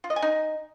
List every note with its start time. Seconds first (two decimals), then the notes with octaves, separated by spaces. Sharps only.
0.04 F4
0.10 D#5
0.16 G#5
0.22 D#4